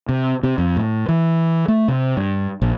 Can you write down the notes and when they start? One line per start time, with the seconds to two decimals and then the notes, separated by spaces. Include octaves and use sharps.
0.09 C3
0.43 C3
0.58 F2
0.77 A2
1.08 E3
1.68 A3
1.88 C3
2.17 G2
2.62 A#1